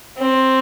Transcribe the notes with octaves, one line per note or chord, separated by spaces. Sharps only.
C4